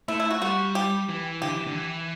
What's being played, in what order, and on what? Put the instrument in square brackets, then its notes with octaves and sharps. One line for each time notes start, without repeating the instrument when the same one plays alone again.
[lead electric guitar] A3 [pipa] E4
[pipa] E4
F#4
[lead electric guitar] G3 [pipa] F#4
[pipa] G4
[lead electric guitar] E3
[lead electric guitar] D3 [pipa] G4
[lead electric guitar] E3
D3
E3